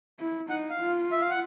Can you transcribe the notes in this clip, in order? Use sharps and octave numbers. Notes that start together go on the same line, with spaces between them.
E4
D#4 F#5
F5
F4
E5
F5
F#5